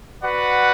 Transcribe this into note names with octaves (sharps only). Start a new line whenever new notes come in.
F#4 B4 D5 F#5